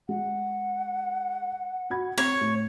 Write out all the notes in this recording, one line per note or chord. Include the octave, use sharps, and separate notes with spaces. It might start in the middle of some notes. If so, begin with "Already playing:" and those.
G#3 F#5
F#4 B5 G#6
C4 C#5
A2